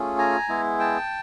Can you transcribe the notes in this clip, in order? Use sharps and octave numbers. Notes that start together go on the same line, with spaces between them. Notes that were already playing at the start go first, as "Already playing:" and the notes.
Already playing: A3 C#4 F4 G#4
G#5 A#5
G#3 B3 E4 G#4
G5 A5